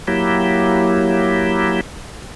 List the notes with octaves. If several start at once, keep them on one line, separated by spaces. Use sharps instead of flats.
F#3 A#3 E4 G4